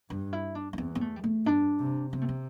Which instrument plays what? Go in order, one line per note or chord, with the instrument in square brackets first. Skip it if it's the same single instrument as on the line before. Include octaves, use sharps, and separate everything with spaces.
[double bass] G2 [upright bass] D4
[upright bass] E4
D4
D4
[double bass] E2 [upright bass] C4
[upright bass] C4
A3
G3
A3
[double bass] G2 [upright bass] D4
[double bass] C3
[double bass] C3 [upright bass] C4
[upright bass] A3
C4